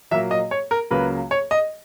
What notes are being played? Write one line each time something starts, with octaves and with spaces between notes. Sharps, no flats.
A#2 F#3 A#3 E5
D#5
C#5
A#4
C#2 C#3 F#3 A#3 B4
C#5
D#5